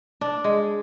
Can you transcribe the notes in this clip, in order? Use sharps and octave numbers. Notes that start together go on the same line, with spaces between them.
D4
G#3